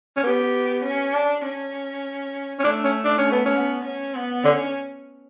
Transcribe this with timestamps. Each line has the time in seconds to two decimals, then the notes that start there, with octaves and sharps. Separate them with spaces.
0.16 C#4
0.23 B3 G4
0.84 C#4
1.13 D4
1.44 C#4
2.59 C#4
2.64 A3 D4
2.84 C#4
3.04 D4
3.18 C#4
3.24 A3
3.32 B3
3.46 C#4
3.54 B3
3.84 C#4
4.14 B3
4.44 D3 C#4